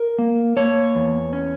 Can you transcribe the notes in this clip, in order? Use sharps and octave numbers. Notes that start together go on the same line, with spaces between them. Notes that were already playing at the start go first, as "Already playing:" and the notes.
Already playing: A#4
A#3
A#3 C#5
E2
C#4